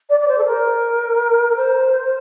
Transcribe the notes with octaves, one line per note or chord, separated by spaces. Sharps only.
D5
D5
C5
A4
A#4
A#4
C5